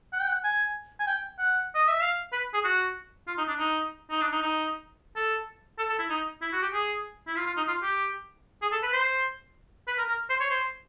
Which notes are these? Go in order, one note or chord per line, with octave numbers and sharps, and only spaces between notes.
F#5
G5
F#5
G#5
G#5
G5
F#5
D#5
E5
F5
B4
G#4
F#4
F4
D#4
D4
D#4
D#4
D4
D#4
D#4
A4
A4
A4
E4
D#4
E4
F#4
G4
G#4
E4
F4
F4
D#4
F4
G4
G#4
A4
B4
C5
B4
A#4
A#4
C5
C#5
C5